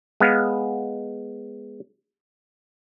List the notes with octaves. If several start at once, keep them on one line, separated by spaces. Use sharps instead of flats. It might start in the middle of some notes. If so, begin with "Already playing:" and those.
G#3 B3 F5